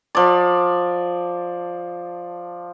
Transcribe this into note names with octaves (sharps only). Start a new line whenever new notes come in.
F3 D5